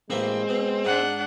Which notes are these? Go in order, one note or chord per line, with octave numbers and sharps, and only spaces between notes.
A1 G#3 A#3 C4 E4
B2
G#2 D4 F#5